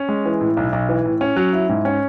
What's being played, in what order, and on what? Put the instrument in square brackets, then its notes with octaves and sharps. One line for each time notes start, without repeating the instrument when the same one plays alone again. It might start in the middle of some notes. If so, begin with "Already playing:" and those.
Already playing: [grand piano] C#4
G#3
E3
A2
B1
B1
E3
A2
C#4
F#3
E4
G#2
C#4